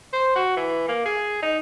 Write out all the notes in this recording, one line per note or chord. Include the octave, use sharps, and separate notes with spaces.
C5
F#4
E3
A#3
G#4
D#4